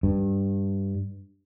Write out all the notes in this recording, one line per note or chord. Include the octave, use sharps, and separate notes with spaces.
G2